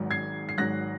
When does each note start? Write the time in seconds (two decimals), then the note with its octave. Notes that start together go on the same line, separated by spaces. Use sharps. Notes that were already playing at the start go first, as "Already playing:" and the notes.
Already playing: G#1 G#2 F#3
0.11 G#6 C7
0.49 C7
0.57 G#1 G#2 F#3 F#6 A#6